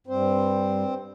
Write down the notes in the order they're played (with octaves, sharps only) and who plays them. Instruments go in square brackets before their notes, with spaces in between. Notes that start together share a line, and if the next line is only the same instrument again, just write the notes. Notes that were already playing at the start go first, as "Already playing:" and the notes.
[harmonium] G2 G3 C4 C5